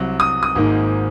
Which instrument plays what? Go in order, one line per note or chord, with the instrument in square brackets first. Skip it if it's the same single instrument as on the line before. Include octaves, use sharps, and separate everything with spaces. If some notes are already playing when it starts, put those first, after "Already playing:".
Already playing: [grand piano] C2 C3 F#3
D#6
D#6
G#1 G#2 D#3 A#3